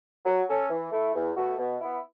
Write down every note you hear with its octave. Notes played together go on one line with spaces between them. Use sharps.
F#3
C#4 A4 C#5
E3
A3 E4
E2
B2 A3 F#4
B2
B3 E4